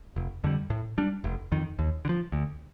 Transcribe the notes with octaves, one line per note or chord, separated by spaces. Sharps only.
F1
F2 D3 G3
A2
G3 D4
F1
F2 D#3
D#2
D3
F3
D2